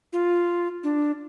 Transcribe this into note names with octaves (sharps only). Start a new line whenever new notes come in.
F4
D4